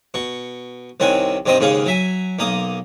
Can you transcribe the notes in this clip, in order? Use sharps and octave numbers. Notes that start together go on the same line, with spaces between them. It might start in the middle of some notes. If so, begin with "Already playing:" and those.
B2 C#6
C2 D#3 C4 C#4 F#5 G#5
G2 D#3 C4 C5 D#5 C6
D#2 G#2 C#3 G#4 F5
F#3 E5 G#5
B1 A#3 A#5 D#6